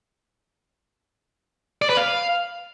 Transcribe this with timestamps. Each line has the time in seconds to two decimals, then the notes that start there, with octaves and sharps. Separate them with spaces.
1.82 D5
1.89 B4
1.97 F5